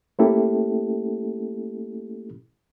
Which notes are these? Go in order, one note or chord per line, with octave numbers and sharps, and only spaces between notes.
A3 A#3 C#4 E4 G4 A4